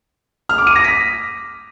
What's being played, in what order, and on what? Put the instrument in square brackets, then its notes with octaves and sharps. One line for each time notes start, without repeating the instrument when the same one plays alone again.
[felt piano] F6
D6
D#7
A#6
B6